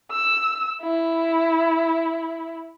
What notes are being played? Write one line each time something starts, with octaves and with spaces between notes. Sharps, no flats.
E6
E4